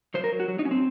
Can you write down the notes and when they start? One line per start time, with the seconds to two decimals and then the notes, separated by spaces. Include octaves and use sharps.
0.14 F#3 C5
0.24 A#4
0.32 F#3
0.40 F#4
0.48 F#3
0.59 D#4
0.65 F#3 C#4
0.71 C4